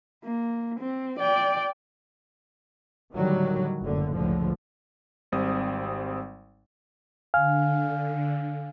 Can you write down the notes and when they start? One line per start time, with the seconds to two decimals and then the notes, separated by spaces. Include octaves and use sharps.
0.24 A#3
0.80 C4
1.19 D5 G5
3.14 A2 D3 D#3 F#3 G3
3.80 F#1 F#2 A2 D3
4.13 C#2 A2 D3 F3
5.32 G#1 G3 C4 D#6
7.34 D3 F5 G#5 F6